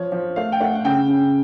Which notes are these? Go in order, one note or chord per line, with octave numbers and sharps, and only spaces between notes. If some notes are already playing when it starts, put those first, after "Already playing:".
Already playing: F3 C#5
F3
A3 F5
G5
A3 F#5
F#5
C#3 G5
C#3